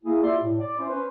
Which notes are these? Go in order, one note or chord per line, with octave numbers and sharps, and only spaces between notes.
A#3 E4 G#4
E4 F4 G4 D5 E5 C6
A2
D5
C#4 E4 C5
C#4 B4 C5